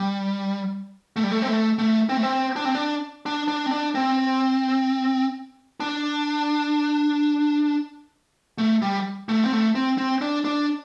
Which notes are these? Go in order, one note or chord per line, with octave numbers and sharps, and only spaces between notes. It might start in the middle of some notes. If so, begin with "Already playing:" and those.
Already playing: G3
A3
G3
A3
C4
A3
A3
C4
A3
C4
D4
C4
D4
D4
D4
C4
D4
C4
D4
A3
G3
A3
C4
A3
C4
C4
D4
D4